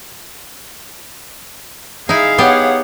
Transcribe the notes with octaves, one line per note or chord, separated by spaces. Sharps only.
D#4 E4 G#4 F5
B3 G4 C#5 F#5